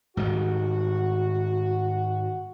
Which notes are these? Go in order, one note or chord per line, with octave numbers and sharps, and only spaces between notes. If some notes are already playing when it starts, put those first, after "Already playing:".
G#2 D#3 G3 F#4